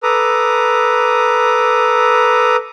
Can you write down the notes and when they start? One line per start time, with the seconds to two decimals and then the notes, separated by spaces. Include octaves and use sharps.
0.03 A4 B4 A#5 D6 D#6